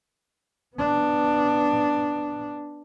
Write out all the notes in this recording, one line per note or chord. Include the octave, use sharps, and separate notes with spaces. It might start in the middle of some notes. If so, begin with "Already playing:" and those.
B3 D4